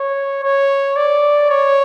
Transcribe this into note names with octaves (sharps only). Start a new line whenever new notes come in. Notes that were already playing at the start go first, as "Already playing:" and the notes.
Already playing: C#5
C#5
D5
C#5